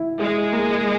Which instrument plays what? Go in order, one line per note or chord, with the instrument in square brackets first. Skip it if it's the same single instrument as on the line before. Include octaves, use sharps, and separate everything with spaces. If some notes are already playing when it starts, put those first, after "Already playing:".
Already playing: [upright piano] E3 E4
[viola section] G#3 [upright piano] G#4
[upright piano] A#3